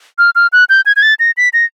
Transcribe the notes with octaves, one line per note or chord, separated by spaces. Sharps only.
F6
F6
F#6
G6
G#6
G#6
A6
A#6
B6
A#6